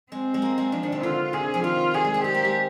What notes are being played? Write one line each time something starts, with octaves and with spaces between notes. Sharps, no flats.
G#3 C4
G#3
A#3
G#3
F3 D4
D#3
C3
D3 F4
C3 G#4
F3
D#3 F4
G3 G#4
G#3
C4
C4 G4
A#3
G#3